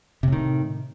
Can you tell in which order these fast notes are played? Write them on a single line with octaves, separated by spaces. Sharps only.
C3 A2 D#3